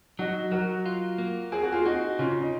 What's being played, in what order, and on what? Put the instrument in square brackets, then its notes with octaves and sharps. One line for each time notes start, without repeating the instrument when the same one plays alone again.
[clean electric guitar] F#3 [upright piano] D#4 F#4
[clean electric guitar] F#3 [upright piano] F#4 A#4
[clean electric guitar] F4
A#3
[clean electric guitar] C4 [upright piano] G#4
[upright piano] F#4
F4 G#4
[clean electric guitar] C4 [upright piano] D#4 F#4
[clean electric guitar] C#3 [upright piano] C#4 F4
[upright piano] D#4